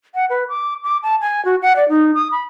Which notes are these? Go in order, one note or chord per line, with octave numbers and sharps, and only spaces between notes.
F#5
B4
D6
D6
A5
G#5
F#4
F#5
D5
D#4
D#6
B5